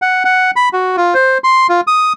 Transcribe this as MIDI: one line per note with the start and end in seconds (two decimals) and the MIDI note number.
0.02 0.24 78
0.25 0.51 78
0.56 0.69 83
0.73 0.96 66
0.97 1.14 65
1.14 1.38 72
1.44 1.67 84
1.69 1.81 65
1.87 2.13 87